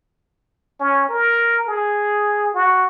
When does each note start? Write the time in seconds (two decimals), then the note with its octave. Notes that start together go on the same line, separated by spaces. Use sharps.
0.80 C#4
1.09 A#4
1.67 G#4
2.54 F#4